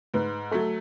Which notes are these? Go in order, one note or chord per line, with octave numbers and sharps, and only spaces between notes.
G#2 B4
F#3 A3 A4